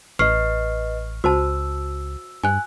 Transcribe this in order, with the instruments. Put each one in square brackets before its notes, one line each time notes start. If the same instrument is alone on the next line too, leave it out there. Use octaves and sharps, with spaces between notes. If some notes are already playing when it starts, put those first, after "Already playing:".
[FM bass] A1 [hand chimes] B4 D#5 [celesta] C#6 F6 C7
[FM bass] C#2 [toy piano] F#4 C5 A5 [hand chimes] E6
[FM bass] G2 [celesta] G#5 F#6